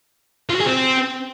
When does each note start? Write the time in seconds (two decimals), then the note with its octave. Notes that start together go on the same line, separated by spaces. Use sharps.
0.50 F4
0.55 F#4
0.61 G#4
0.66 C4